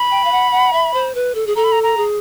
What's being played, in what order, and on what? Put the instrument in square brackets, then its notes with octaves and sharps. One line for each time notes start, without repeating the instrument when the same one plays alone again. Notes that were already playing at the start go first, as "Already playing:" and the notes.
Already playing: [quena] B5
[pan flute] G5
F5
F#5
F#5
E5
C5
B4
A4
G#4
[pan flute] A4 [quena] A#5
[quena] B5
A#5
A#5
[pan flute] G#4